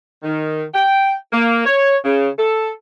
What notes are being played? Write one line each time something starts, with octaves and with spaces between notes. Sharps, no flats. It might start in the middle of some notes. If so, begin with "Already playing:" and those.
D#3
G5
A#3
C#5
C#3
A4